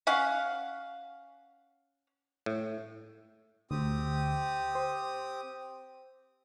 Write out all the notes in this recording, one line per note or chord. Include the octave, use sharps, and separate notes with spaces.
C#4 F5 F#5
A2
D2 C4 G4 D#6
C5